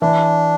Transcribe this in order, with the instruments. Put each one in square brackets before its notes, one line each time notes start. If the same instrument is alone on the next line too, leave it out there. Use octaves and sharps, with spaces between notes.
[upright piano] E3 [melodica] D4